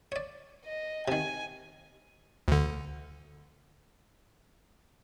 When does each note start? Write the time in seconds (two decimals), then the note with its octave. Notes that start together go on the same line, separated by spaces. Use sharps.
0.12 C#5 D5
0.65 D#5
1.08 C3 D#3 G#5
2.48 D2 D3